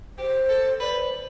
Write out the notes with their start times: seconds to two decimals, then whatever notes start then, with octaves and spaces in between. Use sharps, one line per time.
0.18 G4 C5
0.49 A4
0.80 B4 D5